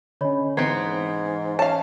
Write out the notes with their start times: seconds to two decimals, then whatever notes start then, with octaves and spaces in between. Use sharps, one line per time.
0.21 D3 C#4 C#5 D#5 B5
0.57 G#2 E3 B3 C4 A#5 G#6 C7
1.59 C#4 F5 A5